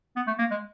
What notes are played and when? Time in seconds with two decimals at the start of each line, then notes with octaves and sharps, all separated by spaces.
0.16 B3
0.27 A3
0.39 A#3
0.51 G#3